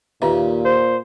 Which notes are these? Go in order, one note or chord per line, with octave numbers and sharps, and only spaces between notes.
D#2 A#2 C#3 F4 B4 E5
C5